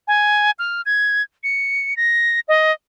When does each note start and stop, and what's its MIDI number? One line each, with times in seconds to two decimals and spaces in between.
0.08 0.51 80
0.59 0.82 89
0.86 1.22 92
1.44 1.96 97
1.97 2.40 94
2.48 2.72 75